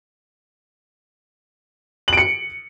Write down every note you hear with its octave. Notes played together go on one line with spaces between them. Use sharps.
C#7 D7 F#7